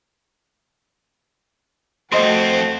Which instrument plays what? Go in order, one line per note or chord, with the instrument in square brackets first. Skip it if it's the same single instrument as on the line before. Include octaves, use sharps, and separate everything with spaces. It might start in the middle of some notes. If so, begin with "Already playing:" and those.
[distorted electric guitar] F2 C4 [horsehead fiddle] A3 F#4 [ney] C5 [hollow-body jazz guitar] D#5 C6